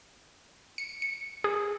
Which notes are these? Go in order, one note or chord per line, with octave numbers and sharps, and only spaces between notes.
C#7
C#7
G#4